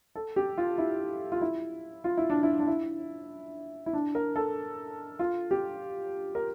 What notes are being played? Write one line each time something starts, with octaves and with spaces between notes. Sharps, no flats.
A4
G4
F4
E4
F4
E4
F4
E4
D4
E4
D4
E4
E4
D4
A#4
A4
F4
G4
A#4